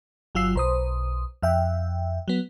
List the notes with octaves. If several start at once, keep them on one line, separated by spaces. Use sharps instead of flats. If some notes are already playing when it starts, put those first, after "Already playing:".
G1 F#3 F4 E6 C7
B1 C5 D#6
F2 E5 G5
F#3 B3